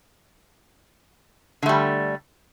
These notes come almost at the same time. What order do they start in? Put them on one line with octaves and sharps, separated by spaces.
D3 A3 G3